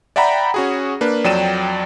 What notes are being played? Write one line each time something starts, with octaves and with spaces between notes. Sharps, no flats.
D5 E5 F#5 G5 A#5 B5
C#4 F#4 G#4
A#3 D4 B4
F2 F#3 D5 G5 D#7 E7